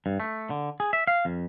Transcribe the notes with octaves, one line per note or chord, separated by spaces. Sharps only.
G2
A3
D3
G#4
E5
F5
F2